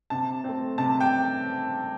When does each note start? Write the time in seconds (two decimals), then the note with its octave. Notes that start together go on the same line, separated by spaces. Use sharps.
0.10 C3 A5
0.44 A3 C4
0.78 C3 A5
1.00 G5